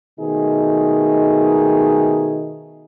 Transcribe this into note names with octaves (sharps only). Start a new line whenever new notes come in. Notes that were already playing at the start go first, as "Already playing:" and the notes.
B2 D#3 A3 D#4 G#4